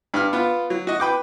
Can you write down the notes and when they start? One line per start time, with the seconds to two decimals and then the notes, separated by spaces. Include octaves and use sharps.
0.14 G2 F6
0.33 B3 F4
0.70 F#3
0.87 F#4 D#5
1.00 B4 G5 D6